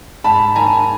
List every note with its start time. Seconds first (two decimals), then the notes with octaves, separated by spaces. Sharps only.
0.24 G#2 A5 B5
0.56 D#3 G#5 A#5